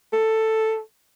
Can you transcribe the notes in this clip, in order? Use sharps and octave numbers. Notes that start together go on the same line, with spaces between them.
A4